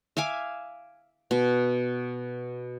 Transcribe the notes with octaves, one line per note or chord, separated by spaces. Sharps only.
E5 F5 G#5 D6
B2